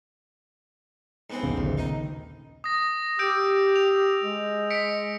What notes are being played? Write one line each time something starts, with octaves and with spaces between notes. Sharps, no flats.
G#2 B3 C4
A#1 D#2 C#3
D2
D#3 D#4
D#6 A#6
G4 E6 G6 D7
F7
G#3
B6 C#7 D7